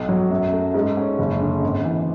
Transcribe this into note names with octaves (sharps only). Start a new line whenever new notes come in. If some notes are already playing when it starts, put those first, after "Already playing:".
Already playing: B1
F#3
F#2
A3
G#2
C#4
F#1
D3
G#1
E3